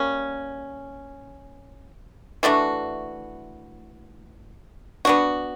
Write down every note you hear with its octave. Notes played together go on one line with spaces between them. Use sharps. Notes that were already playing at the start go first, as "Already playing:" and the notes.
Already playing: G3 A#3 C#4
E3 A3 D4 F#4
B3 D4 F#4